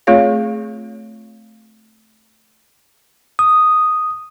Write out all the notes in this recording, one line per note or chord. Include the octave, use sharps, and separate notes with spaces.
A3 C4 F4 G#4 C#5 F5
D#6